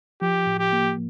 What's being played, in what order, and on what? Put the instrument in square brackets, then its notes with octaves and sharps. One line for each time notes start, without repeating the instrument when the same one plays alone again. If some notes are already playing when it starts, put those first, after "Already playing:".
[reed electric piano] F3 [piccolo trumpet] G4
[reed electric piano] A2
[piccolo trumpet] G4
[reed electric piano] A#3